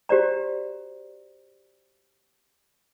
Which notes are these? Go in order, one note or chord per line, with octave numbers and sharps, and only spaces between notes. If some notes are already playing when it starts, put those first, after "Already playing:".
F#4 G4 C5 D5 A#5